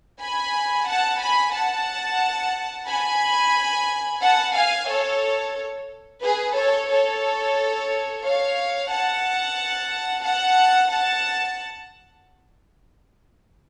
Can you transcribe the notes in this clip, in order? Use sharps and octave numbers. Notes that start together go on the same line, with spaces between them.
G#5 B5
F#5 A5
G#5 B5
F#5 A5
G#5 B5
F#5 A5
F5 G#5
A4 C#5
G#4 B4
A4 C#5
A4 C#5
C#5 F5
F#5 A5
F#5 A5
F#5 A5